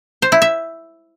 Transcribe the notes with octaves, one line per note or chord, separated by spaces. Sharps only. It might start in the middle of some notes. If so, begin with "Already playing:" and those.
C5
E4
E5